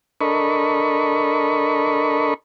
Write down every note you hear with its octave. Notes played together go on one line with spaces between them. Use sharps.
D4 A4 A#4 D#5 B5 C#6